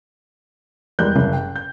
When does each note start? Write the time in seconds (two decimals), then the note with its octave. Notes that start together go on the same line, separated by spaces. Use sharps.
0.99 E2 G3 G#3 A#4 F#6 G6
1.16 F#1
1.33 G5
1.56 G6